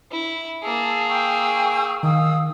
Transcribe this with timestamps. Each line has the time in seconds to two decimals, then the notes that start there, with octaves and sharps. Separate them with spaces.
0.11 E4
0.63 A#3 G#4 A5 E6
1.09 G5 C#6 E6
2.03 D#3 F5 D#6 E6